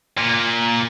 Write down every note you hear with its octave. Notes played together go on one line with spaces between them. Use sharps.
A#2